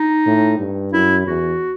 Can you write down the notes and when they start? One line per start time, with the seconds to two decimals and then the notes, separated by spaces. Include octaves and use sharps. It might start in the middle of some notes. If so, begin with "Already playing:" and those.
Already playing: D#4
0.26 A2
0.59 G2
0.93 F#2 E4
1.27 E2 F#4